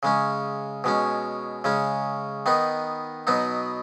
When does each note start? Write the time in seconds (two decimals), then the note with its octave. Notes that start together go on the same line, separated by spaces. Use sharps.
0.03 C#3 G#3 C#4
0.84 B2 G#3 C#4
1.64 C#3 G#3 C#4
2.46 D#3 B3 D#4
3.27 B2 F#3 B3 D#4